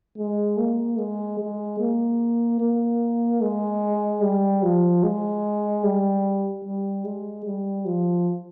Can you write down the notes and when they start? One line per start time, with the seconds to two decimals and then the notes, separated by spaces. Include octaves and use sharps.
0.18 G#3
0.58 A#3
0.98 G#3
1.40 G#3
1.80 A#3
2.61 A#3
3.41 G#3
4.23 G3
4.63 F3
5.03 G#3
5.84 G3
6.65 G3
7.04 G#3
7.45 G3
7.86 F3